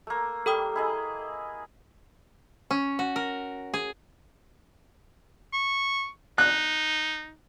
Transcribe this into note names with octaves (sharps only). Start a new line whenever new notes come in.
A3 A#3
G3 A4 G5 D#6
E4 G#4 D#5
C#4
F#4
A#4
G#4
C#6
D#4 F#6